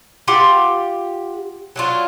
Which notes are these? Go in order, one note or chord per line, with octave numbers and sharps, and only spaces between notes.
F4 G4 F#5
F#3 D4 F4